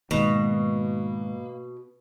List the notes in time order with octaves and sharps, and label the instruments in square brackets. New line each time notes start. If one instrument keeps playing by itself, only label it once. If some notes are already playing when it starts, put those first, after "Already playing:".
[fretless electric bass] G#2 D#3 [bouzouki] B2 [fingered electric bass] A#3